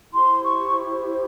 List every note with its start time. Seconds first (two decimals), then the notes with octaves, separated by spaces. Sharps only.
0.12 E4 G4 C5 C6
0.43 C#6